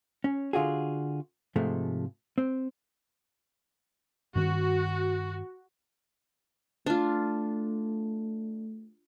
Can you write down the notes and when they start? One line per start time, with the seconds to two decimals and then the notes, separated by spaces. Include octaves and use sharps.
0.24 C#4
0.53 D3 F4 F#4 G#4
1.56 G#2 C3 F3 G#3 A3
2.38 C4
4.35 G2 D#3 C4 F#4
6.86 A3 D4 F4